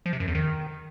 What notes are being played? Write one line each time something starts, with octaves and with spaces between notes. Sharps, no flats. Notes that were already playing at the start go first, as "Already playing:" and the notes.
F3
C3
F#2
E2
D#3